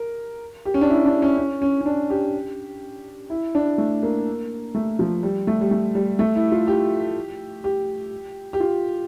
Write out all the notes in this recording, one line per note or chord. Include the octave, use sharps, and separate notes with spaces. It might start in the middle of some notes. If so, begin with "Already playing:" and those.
Already playing: A#4
G4
C#4
D4
E4
D4
C#4
C#4
C#4
C#4
D4
G4
E4
D4
A3
A#3
A3
F3
G3
A3
G3
A3
G3
A3
E4
F4
G4
G4
G4
F4